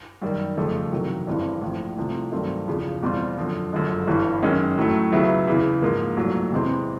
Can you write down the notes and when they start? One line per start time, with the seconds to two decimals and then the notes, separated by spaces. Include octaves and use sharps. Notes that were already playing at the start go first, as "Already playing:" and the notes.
0.22 F#2 D#3 G3
0.57 G1 F2 C#3 F3 A3
0.92 E2 C3 D#3 F#3
1.27 G1 G2 E3 G#3 C4
1.62 A#1 A2 F3
1.97 C2 C3 F3 A3
2.32 G2 D#3 F#3 A3 C4
2.67 E1 E2 C#3 F3
3.03 E2 B2 G3 C4 F4
3.38 F#2 D3 F3
3.73 G1 F#2 D3 F3 G#3
4.07 G1 G2 E3 G3
4.42 F#2 D#3 G#3 C#4
4.78 A2 F#3 A3
5.12 C#2 C#3 F#3 B3 E4
5.47 E2 C#3 E3
5.82 G#2 F3 A#3
6.17 C2 A#2 F#3 A3
6.52 E2 C3 E3 G#3 C4